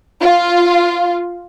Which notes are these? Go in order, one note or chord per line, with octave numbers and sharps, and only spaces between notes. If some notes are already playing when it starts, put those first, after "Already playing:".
F4